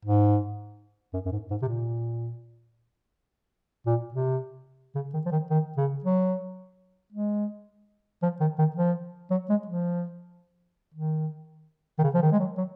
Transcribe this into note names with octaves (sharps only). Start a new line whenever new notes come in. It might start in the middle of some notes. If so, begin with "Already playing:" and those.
G#2
F#2
F#2
G#2
G#2
C3
A#2
A#2
C3
C#3
D#3
F3
D#3
D#3
C#3
F#3
G#3
F3
D#3
D#3
F3
F#3
G#3
F3
D#3
D#3
C#3
F3
D#3
G#3
F#3
F#3